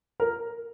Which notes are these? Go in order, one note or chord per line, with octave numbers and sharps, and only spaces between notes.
A#4